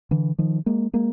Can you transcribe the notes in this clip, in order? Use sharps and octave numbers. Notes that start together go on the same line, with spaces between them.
D3 E3
D#3 F3
G#3 A#3
G#3 A#3